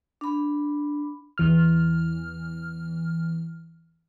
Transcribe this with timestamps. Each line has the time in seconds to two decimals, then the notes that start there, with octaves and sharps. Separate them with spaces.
0.21 D4 B5
1.38 E2 E3 F6